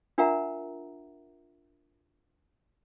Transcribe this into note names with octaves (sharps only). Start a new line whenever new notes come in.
D4 F4 A#4 E5 F#5 A#5